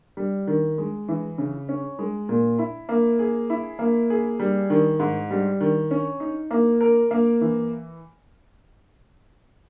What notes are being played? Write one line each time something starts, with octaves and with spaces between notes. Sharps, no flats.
G3
D#3
G#3
E3
C#3
C#4
G#3
A#2
E4
A#3
G#4
E4
A#3
G#4
G3
D#3
G#2
G3
D#3
C#4
D#4
A#3
A#4
A#3
E3